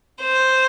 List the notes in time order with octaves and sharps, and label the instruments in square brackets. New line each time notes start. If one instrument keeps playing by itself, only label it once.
[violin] C5